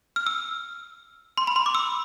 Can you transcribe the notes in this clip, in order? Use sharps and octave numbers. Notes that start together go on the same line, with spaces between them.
F6
E6
C6
B5
C6
D6
E6